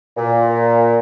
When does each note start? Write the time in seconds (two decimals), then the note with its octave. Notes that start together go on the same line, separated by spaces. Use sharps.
0.17 A#2